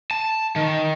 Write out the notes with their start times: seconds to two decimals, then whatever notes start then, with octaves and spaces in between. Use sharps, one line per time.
0.11 A5
0.56 D#3